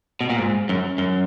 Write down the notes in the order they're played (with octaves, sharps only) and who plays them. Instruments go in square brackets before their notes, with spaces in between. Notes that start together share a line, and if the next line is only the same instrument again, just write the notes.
[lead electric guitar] B2
A#2
G#2
F#2
F#2